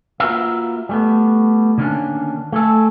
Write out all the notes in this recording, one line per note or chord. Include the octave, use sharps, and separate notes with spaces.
A#3 F4 F#4 A#4 B4 E5
G3 A3 B3
D3 D#3 G3 A#3 C#4 D4
A3 G#4 A4